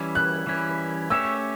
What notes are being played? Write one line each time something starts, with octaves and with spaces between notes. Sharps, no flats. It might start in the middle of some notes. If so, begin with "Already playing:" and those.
Already playing: E3 G3 C#4 E4
F#6
E3 G3 C#4 E4
A3 C#4 G4 C#5 E5 E6